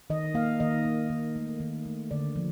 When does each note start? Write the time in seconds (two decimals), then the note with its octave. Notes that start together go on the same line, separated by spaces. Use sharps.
0.10 D#3 D#5
0.34 A#3 F5
0.60 D#3 D#5
0.85 A#3
1.10 D#3
1.36 A3
1.60 D#3
1.86 A3
2.11 D3 D5
2.36 F3